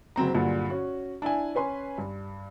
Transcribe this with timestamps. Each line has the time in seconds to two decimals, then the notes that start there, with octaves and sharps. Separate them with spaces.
0.16 F#1 F#3 C4 A#5
0.35 G2 A#2 D3 F#3
0.70 C#4 F#4
1.22 D4 E4 G#5
1.55 C#4 B4 G#5 C6
1.98 G2